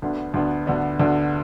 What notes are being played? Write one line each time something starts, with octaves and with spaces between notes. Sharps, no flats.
D2 D3 B3 D4
D2 D3 B3 D4
D2 D3 B3 D4
D2 D3 B3 D4